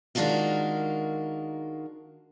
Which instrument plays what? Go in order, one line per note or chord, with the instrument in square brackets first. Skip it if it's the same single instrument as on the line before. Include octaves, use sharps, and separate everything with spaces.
[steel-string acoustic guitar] D#3 G#3 D4 F4 F#4 A#4